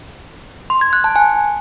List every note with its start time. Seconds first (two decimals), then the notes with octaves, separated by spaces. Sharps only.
0.70 C6
0.81 G#6
0.93 F#6
1.04 A5
1.16 G#5